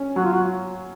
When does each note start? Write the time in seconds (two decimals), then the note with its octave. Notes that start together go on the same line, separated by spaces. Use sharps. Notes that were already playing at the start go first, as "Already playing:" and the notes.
Already playing: C#4
0.16 F#3 F#4
0.24 F4
0.33 F#4